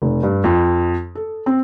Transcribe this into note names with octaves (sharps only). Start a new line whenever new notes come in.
F1
G2
F2
A4
C4